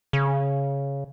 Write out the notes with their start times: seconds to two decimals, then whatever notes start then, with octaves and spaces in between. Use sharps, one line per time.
0.13 C#3